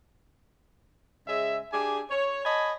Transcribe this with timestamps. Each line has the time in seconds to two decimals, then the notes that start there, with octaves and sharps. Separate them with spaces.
1.27 C#3 G#3 G#4 E5
1.73 D4 G4 G#4 G#5
2.10 C#5
2.45 C#5 D#5 G#5 A5 B5